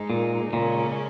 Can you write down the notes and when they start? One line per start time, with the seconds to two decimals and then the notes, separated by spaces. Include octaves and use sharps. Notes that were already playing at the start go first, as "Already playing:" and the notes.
Already playing: G#2 G#3 D#4
0.10 A#2
0.53 A#2 C#3 G#3 C#4